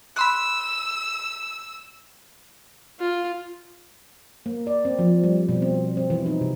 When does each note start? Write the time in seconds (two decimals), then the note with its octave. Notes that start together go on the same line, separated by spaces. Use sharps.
0.16 B5 C6 E6 F#6
2.99 F4
4.46 A#3
4.67 D5
4.85 C4
4.99 F3
5.24 G3
5.49 B2
5.62 C4
5.97 C4
6.10 E3
6.26 D#4
6.41 C3